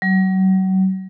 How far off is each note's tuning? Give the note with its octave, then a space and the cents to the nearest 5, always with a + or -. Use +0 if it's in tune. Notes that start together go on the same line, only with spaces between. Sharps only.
F#3 +35